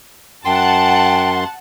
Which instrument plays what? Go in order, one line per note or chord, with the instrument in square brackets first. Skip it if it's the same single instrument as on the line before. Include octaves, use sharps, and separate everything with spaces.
[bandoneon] F#2 C6 [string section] F#5 A5 [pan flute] G5